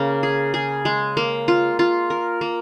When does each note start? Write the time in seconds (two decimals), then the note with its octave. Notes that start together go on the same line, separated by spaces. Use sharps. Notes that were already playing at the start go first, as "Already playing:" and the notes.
Already playing: C#3 A#3
0.23 G#4
0.54 G#4
0.85 G#3
1.17 A#3
1.48 F4
1.79 F4
2.10 A#4
2.41 A#3